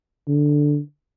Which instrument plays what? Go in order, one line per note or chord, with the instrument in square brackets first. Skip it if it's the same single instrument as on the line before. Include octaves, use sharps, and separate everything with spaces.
[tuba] D3